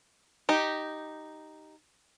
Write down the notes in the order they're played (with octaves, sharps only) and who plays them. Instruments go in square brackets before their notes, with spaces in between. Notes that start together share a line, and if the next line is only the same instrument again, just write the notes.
[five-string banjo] D#4 G4